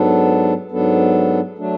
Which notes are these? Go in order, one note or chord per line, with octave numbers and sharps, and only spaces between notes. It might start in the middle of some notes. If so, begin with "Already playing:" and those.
Already playing: G#2 F#3 B3 D4 A4
G#2 F#3 B3 D4 A4
F#3 A3 D4